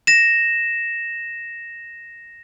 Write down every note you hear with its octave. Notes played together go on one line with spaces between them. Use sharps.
A#6 E7